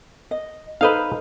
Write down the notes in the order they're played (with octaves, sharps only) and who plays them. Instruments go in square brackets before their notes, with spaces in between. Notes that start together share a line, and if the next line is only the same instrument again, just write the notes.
[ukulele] D#5
[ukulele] D#4 A4 C5 [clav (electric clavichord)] B4 D#5 F5